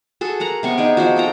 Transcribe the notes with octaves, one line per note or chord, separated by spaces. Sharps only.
F#4 G#4 A4
A#4 F#5 A#5
C3 B3 C#6
D#4 G#4 D5
F3 D#4 F#4
A4 G5 A#5